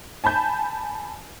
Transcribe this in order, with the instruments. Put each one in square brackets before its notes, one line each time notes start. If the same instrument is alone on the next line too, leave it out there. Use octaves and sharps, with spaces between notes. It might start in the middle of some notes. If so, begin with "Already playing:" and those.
[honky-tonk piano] G#5 A5 B5 G6